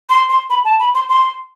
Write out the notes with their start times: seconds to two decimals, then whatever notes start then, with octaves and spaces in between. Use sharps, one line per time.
0.10 C6
0.30 C6
0.50 B5
0.65 A5
0.80 B5
0.95 C6
1.09 C6